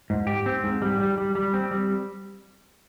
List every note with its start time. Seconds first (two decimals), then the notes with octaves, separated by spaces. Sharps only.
0.10 G#2
0.27 G4
0.46 C4
0.64 G#2
0.82 G3
1.00 G3
1.18 G3
1.35 G3
1.54 C4
1.71 G3